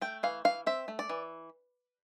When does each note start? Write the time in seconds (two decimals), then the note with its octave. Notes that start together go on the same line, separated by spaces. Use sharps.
0.01 A3 G5
0.23 E3 F5
0.45 E3 F5
0.66 C4 E5
0.88 A3
0.99 D5
1.09 E3